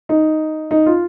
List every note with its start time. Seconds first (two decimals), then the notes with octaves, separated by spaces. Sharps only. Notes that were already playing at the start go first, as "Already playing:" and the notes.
0.09 D#4
0.71 D#4
0.86 F4